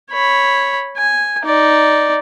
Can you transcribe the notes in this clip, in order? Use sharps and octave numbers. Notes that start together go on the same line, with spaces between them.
C#5 B5
G#5
D#4 D5